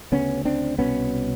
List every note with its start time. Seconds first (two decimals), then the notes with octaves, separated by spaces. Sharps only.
0.12 D2 C#3 B3 C#4
0.45 C4 D4
0.78 C2 B2 B3 C#4